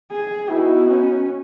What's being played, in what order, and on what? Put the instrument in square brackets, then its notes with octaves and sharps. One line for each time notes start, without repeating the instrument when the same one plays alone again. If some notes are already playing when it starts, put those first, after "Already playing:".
[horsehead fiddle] G#4
[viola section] B3 D#4 F#4 [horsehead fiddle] E4
[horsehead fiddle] C#4